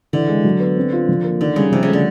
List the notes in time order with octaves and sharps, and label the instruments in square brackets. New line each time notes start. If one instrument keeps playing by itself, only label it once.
[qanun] D3 [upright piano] E3
[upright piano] G#3
F#3
B3
C4
F4
F3
A#3
[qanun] D3 [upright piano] D#3
[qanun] C#3 [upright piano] G3
[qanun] C3 [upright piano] F3
[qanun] C#3
[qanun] D3 [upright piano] A3